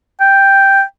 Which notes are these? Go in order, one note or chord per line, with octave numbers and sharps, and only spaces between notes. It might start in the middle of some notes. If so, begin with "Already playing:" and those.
G5